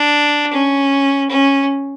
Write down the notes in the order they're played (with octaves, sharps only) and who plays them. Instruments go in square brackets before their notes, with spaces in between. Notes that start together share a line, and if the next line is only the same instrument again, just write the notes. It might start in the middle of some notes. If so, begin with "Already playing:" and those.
Already playing: [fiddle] D4
C#4
C#4